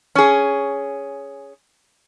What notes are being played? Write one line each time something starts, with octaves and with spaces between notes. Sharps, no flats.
C#4 G#4